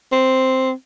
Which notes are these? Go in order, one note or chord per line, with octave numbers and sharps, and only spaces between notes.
C4